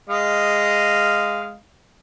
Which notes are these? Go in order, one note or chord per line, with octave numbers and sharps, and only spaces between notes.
G#3 D#5 F5